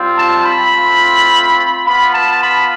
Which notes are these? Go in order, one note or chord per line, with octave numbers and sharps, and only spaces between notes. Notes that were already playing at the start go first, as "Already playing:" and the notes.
Already playing: G3 C4 F4
A5
B5
A3 C4 F4
B3 F4 B5
A5
B5